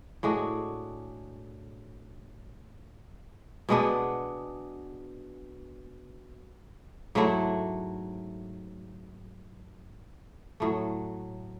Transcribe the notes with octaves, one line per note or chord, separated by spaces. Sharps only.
A2 G#3 D4 F#4
B2 G#3 B3 D4
G#2 F#3 A3 E4
A2 F#3 A3